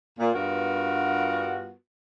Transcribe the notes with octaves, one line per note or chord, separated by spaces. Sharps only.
A#2
G2 G3 B3 F4 F#4 A#4